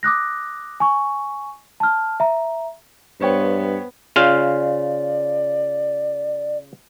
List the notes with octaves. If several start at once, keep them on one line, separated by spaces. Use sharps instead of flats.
D6 D#6 F#6 A#6
G#5 C#6
A5 F6
E5 A#5
G2 B3 C5 C#5 G5
C#3 F4 D5 F5